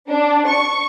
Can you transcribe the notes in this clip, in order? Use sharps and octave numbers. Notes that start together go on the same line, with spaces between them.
D4
C#6